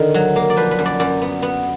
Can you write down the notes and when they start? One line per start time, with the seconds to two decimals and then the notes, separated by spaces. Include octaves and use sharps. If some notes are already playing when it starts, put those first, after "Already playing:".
Already playing: D3 D#3
0.14 F#3
0.36 A#3
0.50 D5
0.57 F3 B4
0.71 B4
0.78 F#2
0.86 D5
1.00 F#2 D5
1.22 B3
1.42 B3